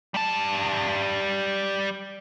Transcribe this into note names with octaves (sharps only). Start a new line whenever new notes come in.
G3 A5